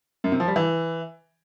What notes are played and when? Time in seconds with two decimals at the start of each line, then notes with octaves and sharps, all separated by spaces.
0.24 F#2
0.32 C3
0.40 F3
0.48 G3
0.56 E3